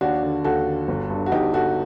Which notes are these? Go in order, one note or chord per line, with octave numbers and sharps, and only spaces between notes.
D#2 D4 F#4
D3
D#2 F#4 A4
D3
G1
G2 D3
F#4
G1 D#4 G4
G2 D3 F#4 A4